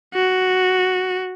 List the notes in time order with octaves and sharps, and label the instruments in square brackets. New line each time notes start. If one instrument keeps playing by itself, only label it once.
[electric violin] F#4